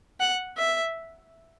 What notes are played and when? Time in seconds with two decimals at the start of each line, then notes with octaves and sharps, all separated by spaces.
0.20 F#5
0.57 E5